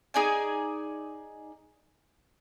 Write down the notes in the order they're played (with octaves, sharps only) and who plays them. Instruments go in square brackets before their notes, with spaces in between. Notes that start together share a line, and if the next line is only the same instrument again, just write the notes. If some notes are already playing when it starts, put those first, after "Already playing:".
[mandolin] D#4 G#4 D5 G#5